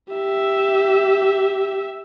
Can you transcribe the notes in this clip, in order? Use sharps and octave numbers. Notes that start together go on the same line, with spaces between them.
G4 E5